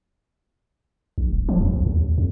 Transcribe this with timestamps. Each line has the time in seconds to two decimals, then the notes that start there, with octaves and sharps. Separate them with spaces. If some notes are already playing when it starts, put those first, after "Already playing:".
1.18 A#1
1.33 D1
1.49 F3
1.61 E2
1.74 B1
1.86 D#2
2.18 F2